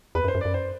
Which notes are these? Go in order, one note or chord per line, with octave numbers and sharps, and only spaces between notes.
E2 B4
F#2
C5
F#2
D5
F#2
C5